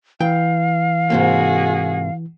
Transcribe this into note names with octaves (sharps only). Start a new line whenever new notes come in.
E3 F5 G5
G#2 C3 A#3 F#4 G#4